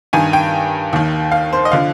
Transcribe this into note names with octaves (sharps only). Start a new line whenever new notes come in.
G2 D#3 G#5
G5
D#2 D#3
F5
C5
D#5
D3 F3 F5